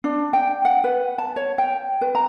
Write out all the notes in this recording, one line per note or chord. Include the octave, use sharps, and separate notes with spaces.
D4
G5
F#5
B4
A5
C#5
G5
B4
A#5